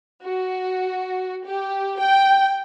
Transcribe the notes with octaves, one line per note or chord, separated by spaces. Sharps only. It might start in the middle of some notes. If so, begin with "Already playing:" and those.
F#4
G4
G5